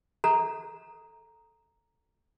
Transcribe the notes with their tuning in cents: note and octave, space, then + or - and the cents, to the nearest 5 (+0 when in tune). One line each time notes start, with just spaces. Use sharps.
A4 +0 A#5 +0